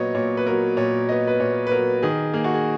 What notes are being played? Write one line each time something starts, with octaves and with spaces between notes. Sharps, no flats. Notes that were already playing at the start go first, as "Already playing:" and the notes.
Already playing: A#2 F#3 B3 C#5 D#5
A#2 C#5
B4
F#3 B3 A#4
A#2 C#5
F#3 B3 D#5
B4
A#2 C#5
B4
F#3 B3 A#4
D#3 G#4
A#3 G#4
F#4
G#4